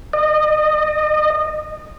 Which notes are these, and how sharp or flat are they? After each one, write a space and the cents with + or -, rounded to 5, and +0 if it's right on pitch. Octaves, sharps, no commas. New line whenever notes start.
D#5 -25